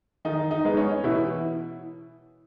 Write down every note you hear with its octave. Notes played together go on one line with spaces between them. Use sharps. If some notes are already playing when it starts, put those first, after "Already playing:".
D#3 D#4
D#4
G#3 B3 D#4
C#4
B2 E3 E4